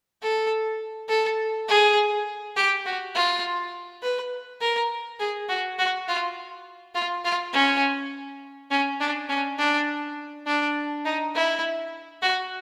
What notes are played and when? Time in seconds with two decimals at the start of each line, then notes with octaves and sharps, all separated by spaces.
0.22 A4
1.09 A4
1.68 G#4
2.56 G4
2.85 F#4
3.15 F4
4.02 B4
4.61 A#4
5.19 G#4
5.49 F#4
5.79 F#4
6.08 F4
6.95 F4
7.24 F4
7.53 C#4
8.71 C#4
9.00 D4
9.29 C#4
9.58 D4
10.47 D4
11.05 D#4
11.35 E4
12.22 F#4